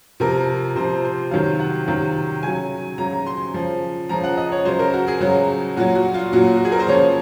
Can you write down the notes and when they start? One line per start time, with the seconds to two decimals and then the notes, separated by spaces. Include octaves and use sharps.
0.20 C3 F3 A#4
0.75 C3 F3 C5
1.04 C5
1.31 C3 D#3 F#3 F5
1.59 F#5
1.87 C3 D#3 F#3 F5
2.43 C#3 F#3 G#5
2.98 C#3 F#3 A#5
3.13 A#5
3.26 C6
3.54 C#3 F3
4.09 C#3 F3 A#5
4.23 F#5
4.38 D#5
4.52 C#5
4.65 C#3 F#3 C5
4.79 A#4
4.93 F#4
5.08 G#4
5.20 C#3 F#3 F#4
5.76 A#2 F#3 F#4
5.95 F#4
6.14 F4
6.33 A#2 F#3 F#4
6.57 F#4
6.65 G#4
6.72 A#4
6.79 C5
6.88 C#3 F3 C#5